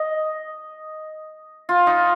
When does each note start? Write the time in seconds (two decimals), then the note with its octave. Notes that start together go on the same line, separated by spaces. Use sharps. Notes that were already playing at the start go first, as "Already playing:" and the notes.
Already playing: D#5
1.69 F4
1.87 D#4